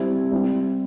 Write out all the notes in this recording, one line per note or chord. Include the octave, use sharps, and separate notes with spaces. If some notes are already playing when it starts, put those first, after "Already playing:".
Already playing: G3 C4 E4 G4
G3 C4 E4 G4